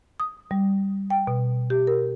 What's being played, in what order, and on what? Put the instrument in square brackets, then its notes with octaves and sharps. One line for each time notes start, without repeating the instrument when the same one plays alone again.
[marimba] D#6
G3
G5
B2
G4
A#4